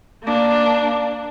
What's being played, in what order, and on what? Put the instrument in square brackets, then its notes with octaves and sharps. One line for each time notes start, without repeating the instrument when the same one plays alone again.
[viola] A#3 D4